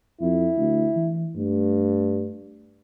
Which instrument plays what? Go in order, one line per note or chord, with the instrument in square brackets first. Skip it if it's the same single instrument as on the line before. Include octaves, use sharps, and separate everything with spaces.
[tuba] F2 [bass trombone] E4
[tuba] D2
E3
[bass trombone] G2 [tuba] A3